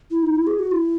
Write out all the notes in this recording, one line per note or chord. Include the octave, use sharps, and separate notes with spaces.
E4
D#4
E4
G#4
F#4
E4